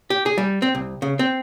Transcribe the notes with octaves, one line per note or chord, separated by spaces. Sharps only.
G4
G#4
G3
C4
C2
C#3
C4